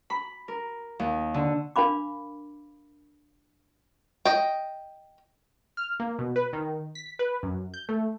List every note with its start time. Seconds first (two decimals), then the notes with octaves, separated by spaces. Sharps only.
0.10 B5
0.48 A#4
0.99 D#2
1.34 D3
1.76 D4 A#4 F5 B5 D6
4.25 D#5 G5
5.77 F6
6.00 A#3
6.19 B2
6.36 B4
6.53 D#3
6.95 B6
7.19 B4
7.43 F#2
7.74 G6
7.89 A3